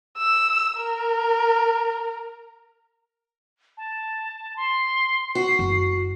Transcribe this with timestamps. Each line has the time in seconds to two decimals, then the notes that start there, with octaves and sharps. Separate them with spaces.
0.18 E6
0.78 A#4
3.77 A5
4.56 C6
5.35 F#4 C7
5.59 F#1